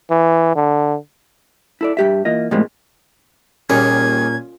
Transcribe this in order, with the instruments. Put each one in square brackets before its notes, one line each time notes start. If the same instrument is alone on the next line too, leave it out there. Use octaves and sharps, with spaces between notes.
[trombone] E3
D3
[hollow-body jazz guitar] E4 A4 D5
G2 G4 E5
E3 A#3 F4 D#5
A2 F3 G3 G#3 A#3 C4
[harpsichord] D#2 G3 G#4 [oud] A#2 [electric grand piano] C#4 [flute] G#6